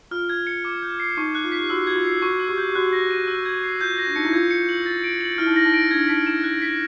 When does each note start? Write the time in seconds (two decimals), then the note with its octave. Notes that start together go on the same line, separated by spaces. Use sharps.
0.11 F4 F6
0.29 G#6
0.47 C#7
0.65 D6
0.82 G6
1.00 C7
1.17 D#4 C#6
1.35 F#6
1.44 F4
1.52 B6
1.60 G4
1.70 F#4 E6
1.87 F#4 G#6
1.96 F4
2.05 C7
2.22 F#4 C#6
2.40 E6
2.49 G4
2.57 G6
2.69 G4
2.75 F#4 F#6
2.92 A#6
3.11 D#7
3.27 E6
3.45 G#6
3.63 C7
3.81 F4 G6
3.98 A#6
4.07 D4
4.16 D#4 C#7
4.25 E4
4.33 F4 G#6
4.51 C#7
4.69 F#7
4.86 A6
5.04 D7
5.21 F#7
5.38 E4 F6
5.46 D#4
5.53 E4
5.56 A#6
5.65 D#4
5.74 D7
5.91 D4 G#6
6.08 D#4 B6
6.26 E4 E7
6.43 F#6
6.62 B6